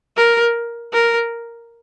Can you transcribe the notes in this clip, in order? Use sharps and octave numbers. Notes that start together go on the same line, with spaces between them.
A#4
A#4